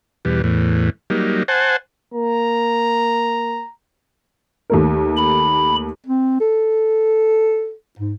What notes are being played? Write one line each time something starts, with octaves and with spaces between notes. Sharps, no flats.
E2 B2 G3
E2 A2
F#3 G3 A#3 D#4
C5 F#5 G#5 A5
A#3 A#5
D#2 A3 A#4
B5
C4
A4
G#2